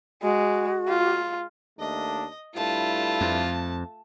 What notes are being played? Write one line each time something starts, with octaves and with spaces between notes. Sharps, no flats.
G#3 F#4
F4
D#2 A3 D4 D#5
G2 A3 E4 F4 A5
F2